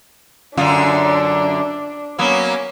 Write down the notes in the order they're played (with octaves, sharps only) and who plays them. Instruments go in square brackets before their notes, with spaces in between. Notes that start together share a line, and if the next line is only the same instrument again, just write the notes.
[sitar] F#2 D3 F4 [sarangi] D4
[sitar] F#3 A#3 B3 [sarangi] C#4